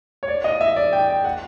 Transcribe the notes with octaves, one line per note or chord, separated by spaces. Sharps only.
C#5
D5
D#5
E5
D5
G5
G5
F#5